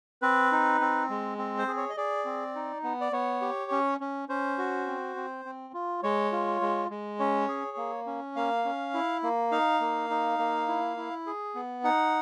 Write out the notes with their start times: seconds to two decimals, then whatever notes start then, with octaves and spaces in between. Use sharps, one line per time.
0.22 C4 B4
0.52 D#4
0.81 C4
1.09 G#3
1.38 C4
1.59 C5
1.68 G#4
1.77 C#5
1.90 D#5
1.97 G#4 D5
2.25 C4
2.55 D#4
2.84 B3
3.01 D5
3.12 B3 C#5
3.41 G4
3.71 C#4
4.00 C#4
4.29 C#4 C5
4.58 F#4
4.87 C4
5.16 C4
5.45 C4
5.74 F4
6.03 G#3 C#5
6.32 F4
6.61 G#3
6.90 G#3
7.19 C#4 C#5
7.48 G#4
7.77 A#3
8.06 C#4
8.36 A#3 F5
8.65 C#4
8.94 E4
9.23 A#3
9.52 D#4 F5
9.81 A#3
10.10 D#4
10.39 A#3
10.68 E4
10.97 E4
11.27 G#4
11.55 B3
11.84 D#4 F#5